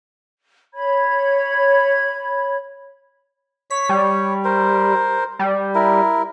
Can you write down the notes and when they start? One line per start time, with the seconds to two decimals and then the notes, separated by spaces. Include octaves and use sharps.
0.74 C#5 B5 G#6
3.70 C#5 B6
3.89 G3
4.44 A#4 C5
5.39 G3
5.75 E4 A#4